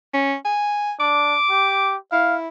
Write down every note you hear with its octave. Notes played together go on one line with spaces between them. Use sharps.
C#4
G#5
D4 D6
G4
E4 F5